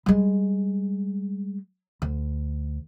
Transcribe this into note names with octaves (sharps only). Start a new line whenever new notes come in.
G3 G#3
D2